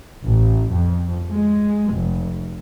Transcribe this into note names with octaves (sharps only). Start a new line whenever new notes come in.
A1
F2
G#3
F1